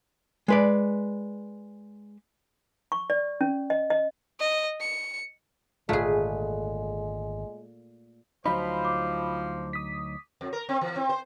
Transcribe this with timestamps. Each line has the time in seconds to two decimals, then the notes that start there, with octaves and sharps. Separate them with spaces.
0.48 G#3 B4 D5
2.92 C#6
3.10 D5
3.41 C#4
3.70 D#5
3.90 D#5
4.40 D#5
4.81 C#7
5.89 G#1 A#2 D3 G#3 A3 G#4 B4
8.46 D2 F3 F#3 D#4 C5 B5
8.85 D6
9.73 D#6 B6
10.41 F2
10.53 A#4
10.69 C4
10.81 E3
10.96 C4
11.09 C5